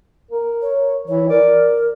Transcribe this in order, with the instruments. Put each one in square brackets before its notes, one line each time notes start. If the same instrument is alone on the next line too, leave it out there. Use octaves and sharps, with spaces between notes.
[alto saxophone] A#4
[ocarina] C#5
[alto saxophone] E3 [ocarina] C#5
[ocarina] A#4 [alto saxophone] D5